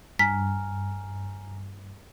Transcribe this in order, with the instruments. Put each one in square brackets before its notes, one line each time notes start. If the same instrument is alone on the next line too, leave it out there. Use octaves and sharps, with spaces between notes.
[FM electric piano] G2 [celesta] G#5 A#5 F6 [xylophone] B6